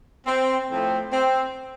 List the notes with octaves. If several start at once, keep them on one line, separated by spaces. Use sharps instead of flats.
C4
A2 F3 A3 C4
C4